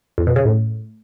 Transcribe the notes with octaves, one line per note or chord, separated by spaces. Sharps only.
F2
B2
C#3
A2